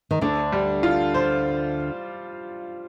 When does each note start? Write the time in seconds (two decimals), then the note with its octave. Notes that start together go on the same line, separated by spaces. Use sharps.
0.11 D#3
0.21 D2 D3 D4
0.52 G3
0.83 F4
1.14 C5